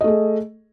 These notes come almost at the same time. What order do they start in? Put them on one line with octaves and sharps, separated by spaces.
D#5 A3 G#4